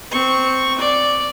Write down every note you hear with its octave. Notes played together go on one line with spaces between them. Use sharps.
C4 C#6
D5